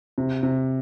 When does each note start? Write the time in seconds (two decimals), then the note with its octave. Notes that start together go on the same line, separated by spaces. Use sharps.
0.18 C3
0.43 C3